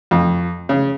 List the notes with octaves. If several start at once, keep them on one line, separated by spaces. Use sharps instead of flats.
F2
C#3